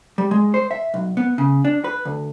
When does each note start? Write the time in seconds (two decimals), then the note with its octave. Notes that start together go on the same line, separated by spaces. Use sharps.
0.18 G3
0.31 G#3
0.54 C5
0.71 E5
0.94 B1
1.17 B3
1.38 C#3
1.65 D4
1.84 B4
2.05 D2